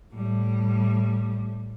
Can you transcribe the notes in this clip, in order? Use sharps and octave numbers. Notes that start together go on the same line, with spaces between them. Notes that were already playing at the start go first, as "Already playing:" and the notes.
A2 G3